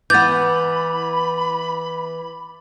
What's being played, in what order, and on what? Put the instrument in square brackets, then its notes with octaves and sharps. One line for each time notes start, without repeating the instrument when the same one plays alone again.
[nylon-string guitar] E3 B3 [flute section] B5 [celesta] D6 A6 [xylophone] G6